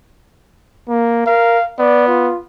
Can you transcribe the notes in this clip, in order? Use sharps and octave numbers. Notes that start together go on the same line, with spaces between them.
A#3
A#4 F5
B3 D5
F4